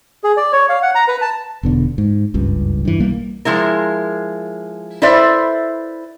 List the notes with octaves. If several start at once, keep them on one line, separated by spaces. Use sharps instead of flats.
G#4
D5
C#5
F5
F#5
A#5
B4
A5
E1 B2 D3
G#2
F#1 C#2 G2
G2 E3
B1 G3 A#3
F3 G#3 E4 A#4
E4 A4 B4 C5 D5 E5